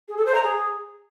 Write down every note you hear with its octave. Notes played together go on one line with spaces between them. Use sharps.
G#4
A4
C5
A#5
G#4